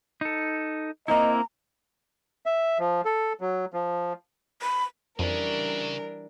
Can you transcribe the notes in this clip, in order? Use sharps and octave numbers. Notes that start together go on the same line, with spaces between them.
D#4 A4
A#3 C4 E4 D#5 A#5
E5
F3
A4
F#3
F3
B5
F2 C#3 E3 G3 C#4 D4 A#4